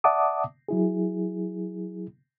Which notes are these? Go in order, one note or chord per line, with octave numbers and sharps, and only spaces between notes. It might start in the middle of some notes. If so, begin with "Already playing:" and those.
D5 E5 F#5 A5 D6 D#6
F#3 E4 G#4